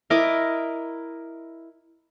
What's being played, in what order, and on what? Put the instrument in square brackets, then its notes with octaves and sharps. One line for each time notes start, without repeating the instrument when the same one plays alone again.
[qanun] E4 A#4 D#5 D6